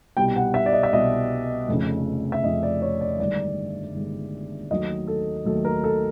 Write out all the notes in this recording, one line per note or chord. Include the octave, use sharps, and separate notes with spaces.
C2 B2 G3 G5
F#5
E5
D5
D#5
E5
C2 B2 G3 D#5
F1 F2 C#3
E5
F1 F2 C#3 D#5
D5
C#5
D5
G1 G2 D#3 G#3 D5
G1 G2 D#3 G#3
D#2 D#3 F#3 A3 D#5
A4
D#2 D#3 F#3 A3 A4
A#4
A4